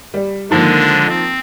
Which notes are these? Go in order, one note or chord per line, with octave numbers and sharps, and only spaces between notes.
G3
D3 D#3 F3 G#3 A#3 D4
C4